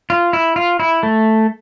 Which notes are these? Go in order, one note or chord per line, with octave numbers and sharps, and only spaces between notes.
F4
E4
F4
E4
A3